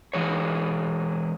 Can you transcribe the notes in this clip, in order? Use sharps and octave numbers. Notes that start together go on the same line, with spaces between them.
E3 G#3 C#5